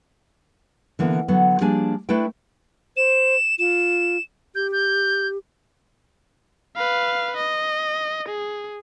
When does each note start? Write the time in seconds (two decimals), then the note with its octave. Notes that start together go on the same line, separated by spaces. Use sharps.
0.99 D3 E3 A#3 B3
1.28 D3 F#3 B3
1.61 F3 G3 A#3 D4 G#4 G#5
2.09 A3 D4 E4 B4 D5 G5
2.97 C5 E7
3.59 F4 E7
4.55 G4 G6
4.72 G6
6.76 B4 F5
7.37 D#5
8.28 G#4